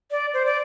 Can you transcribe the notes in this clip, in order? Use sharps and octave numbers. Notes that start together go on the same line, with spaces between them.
D5
C5
D5